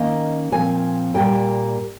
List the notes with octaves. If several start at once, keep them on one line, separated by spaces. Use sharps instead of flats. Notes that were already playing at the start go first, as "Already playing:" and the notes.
Already playing: D#3 A#3 C#4 D#5
A#2 F3 C4 G#5
A#2 G3 A#3 G5